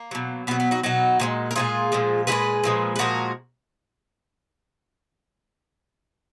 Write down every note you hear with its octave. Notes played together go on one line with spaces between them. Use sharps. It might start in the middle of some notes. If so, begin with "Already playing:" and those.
Already playing: A#3
B2 F#3
B2 F#3 B3
B3
D#4 F#4
B2 F#3 D#4 F#4
A#2 F3 G#3
A#4
A#2 F3 G#3 F4 G#4
A#2 F3 G#3
A#2 F3 G#3 G#4 B4
A#2 F3 G#3
B4
A#2 F3 G#3 F#4 A#4